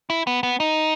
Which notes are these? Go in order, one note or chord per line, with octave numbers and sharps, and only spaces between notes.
E4
B3
B3
D#4